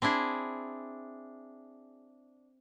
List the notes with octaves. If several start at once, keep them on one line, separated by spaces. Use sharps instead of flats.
C4 D4 E4 G#4